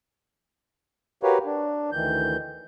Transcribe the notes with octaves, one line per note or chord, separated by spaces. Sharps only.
F#4 G4 A#4 B4 C#5 F5
D4
D2 D#3 E3 G6